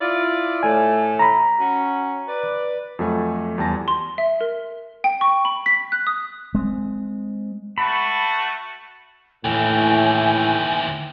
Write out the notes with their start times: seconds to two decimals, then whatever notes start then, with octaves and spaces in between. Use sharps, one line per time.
0.01 E4 F4 D5
0.63 A2 A3 G#5
1.19 A#5 B5
1.59 C#4 F#4
2.27 B4 D5
2.99 F2 F#3 A3 G#5
3.58 E2 G3 G#5 A5 A#6
3.88 C6
4.18 E5
4.41 A#4
5.04 G5
5.21 C#6
5.45 B5
5.66 B6
5.92 F#6
6.07 D#6
6.55 G#3 C4
7.78 A3 F#4 A5 B5
9.45 D#2 A2 E3 G5 G#5